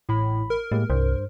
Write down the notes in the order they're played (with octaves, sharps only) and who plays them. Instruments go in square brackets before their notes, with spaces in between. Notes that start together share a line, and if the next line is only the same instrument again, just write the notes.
[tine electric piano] A1 B5 [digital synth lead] A2
[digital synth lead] A#4
[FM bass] A2 [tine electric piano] G#3 A#3 G4
[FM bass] C2 [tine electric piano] G2 C5